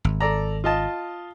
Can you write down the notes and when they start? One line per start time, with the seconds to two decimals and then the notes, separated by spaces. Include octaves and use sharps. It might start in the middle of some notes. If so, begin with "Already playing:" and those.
0.05 G#1
0.20 A4 D5 A#5
0.64 F4 D#5 A5